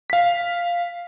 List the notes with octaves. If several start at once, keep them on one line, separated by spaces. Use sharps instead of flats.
F5 B6